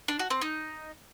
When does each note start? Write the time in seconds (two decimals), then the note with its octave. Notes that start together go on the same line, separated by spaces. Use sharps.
0.08 D4
0.19 F#4
0.30 C4
0.41 D#4